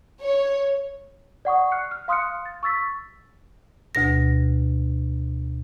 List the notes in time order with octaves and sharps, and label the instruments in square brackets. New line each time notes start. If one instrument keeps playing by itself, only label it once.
[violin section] C#5
[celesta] D5 F#5 C#6 D#6
F6 F#6 C7 C#7
F6
F5 C6 D#6 F6 F#6 C#7
A6
C#6 E6 A6 B6
[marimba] D2 B2 A#6